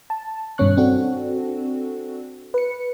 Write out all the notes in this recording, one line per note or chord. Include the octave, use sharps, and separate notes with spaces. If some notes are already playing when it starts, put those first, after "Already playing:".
A5
G2 B2 D#3 C#4 C#6 F#6
C4 D4 F#4 A4
B4 C#7